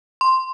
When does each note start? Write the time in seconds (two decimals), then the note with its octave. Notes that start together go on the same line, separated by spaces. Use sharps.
0.21 C6